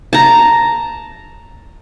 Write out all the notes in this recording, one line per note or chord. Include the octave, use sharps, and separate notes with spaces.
A5 A#5